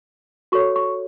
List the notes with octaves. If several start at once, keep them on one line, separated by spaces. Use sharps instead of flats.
F#4 A4 C#5 C#6
C#6